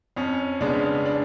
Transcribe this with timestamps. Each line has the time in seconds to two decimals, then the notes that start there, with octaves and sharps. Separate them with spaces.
0.16 F2 C#4
0.61 C#3 G#3 B3 D4
1.06 D4